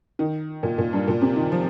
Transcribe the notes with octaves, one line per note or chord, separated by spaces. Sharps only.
D#3
A#2
A#2
G2
A#2
C3
D#3
F3